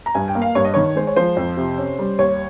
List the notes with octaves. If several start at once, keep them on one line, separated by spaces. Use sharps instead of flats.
A#5
G2 G#5
G5
A#3
F5
G2 C#5
D#5
D#3 C#5
G#3 C5
C#5
F3 C5
F2
C3
C#4
G3
D#2 C#5